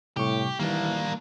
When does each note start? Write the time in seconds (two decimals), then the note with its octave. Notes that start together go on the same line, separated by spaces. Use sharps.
0.17 A2 C3 G3 G4 C#6
0.60 D#3 E3 G3 A#3 D4